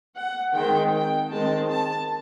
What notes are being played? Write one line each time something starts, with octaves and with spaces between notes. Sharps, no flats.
F#5
D#3 G#3 C4 G5
G5
D#3 G#3 C4 A5
A5